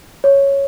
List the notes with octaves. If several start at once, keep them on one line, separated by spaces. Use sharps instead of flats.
C#5